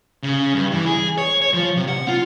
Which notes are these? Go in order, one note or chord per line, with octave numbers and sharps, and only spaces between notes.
C#3
G2
E3
G#4
C#5
C#5
F3
C3
F#5
F4